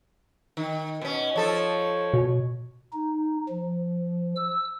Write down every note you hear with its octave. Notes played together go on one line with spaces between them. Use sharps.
D#3
B2 C#4
F3 A4 C#5
B2
D#4
F3
E6